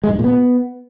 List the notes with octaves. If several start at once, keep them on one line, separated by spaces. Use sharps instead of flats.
G#3
G#2
G2
A#2
B3